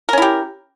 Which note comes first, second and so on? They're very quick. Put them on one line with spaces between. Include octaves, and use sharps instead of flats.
A#4 C#4 E4 G4